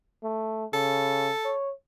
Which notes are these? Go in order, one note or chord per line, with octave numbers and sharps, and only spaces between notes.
A3
C#3 A4
C#5